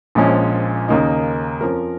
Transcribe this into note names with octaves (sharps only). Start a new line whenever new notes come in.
A#1 A#2 F3 G#3 C#4
D#2 C#3 A#3 D#4
F2 F3 C#4 A#4